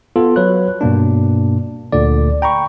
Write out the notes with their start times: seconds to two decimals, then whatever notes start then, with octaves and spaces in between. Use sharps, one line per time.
0.16 B3 F4 A4
0.36 F#3 B4 C#5 F#6
0.81 G2 B2 A#3 D4
1.92 D2 A#2 D3 D5
2.42 G5 A#5 B5 C#6